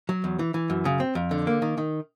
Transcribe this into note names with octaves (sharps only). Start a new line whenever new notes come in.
F#3
E2
E3
E3
F#2
C#3
C4
F2
D3
A#3
D#3
D#3